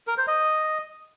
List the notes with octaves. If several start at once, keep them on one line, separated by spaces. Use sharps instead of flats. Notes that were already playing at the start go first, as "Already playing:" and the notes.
A#4
C5
D#5